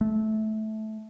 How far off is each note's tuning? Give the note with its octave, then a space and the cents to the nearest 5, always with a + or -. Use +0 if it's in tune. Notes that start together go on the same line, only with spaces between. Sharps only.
A3 -15